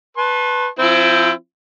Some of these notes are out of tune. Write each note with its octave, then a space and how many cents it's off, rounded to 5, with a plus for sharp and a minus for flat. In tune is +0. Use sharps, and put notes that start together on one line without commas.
B4 +0 A5 -10 C6 +45
F3 +0 C4 +0 E4 +30